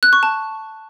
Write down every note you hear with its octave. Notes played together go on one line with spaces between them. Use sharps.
F#6
C#6
A5